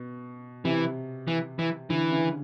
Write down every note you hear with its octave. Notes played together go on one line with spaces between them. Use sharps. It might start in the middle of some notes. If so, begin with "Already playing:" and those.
Already playing: B2
C3 E3
E3
E3
D3 E3
C#3